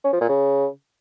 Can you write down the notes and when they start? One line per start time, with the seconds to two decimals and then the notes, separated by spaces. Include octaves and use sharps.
0.04 C#4
0.13 F3
0.21 A#2
0.29 C#3